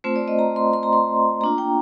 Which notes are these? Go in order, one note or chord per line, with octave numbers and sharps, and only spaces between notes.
A3 C4 F4 C5
D5
D#5
A#5
C6
C6
A#5
C6
A#3 D4 F4 A#5
G5